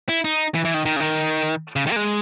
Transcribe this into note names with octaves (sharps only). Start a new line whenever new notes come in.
E4
D#4
E3
E3
D#3
D#3
C#3
D#3
C#3
D#3
A#3
G#3